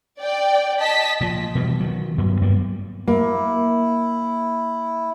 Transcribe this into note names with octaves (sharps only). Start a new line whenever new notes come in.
D5 G5
D#5 A5 B6
A#2 F3
B2 E3 F3 G3
D#3 F#3
D2 G2 F#3 B3
G2 G3 A#3 B3
A#3 E4